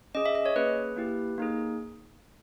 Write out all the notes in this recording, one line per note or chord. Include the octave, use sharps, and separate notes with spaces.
C#4 G#4 D#5
E5
D#5
C#5
A#3 C#4 G#4 B4
A#3 E4 G4
A#3 D#4 G#4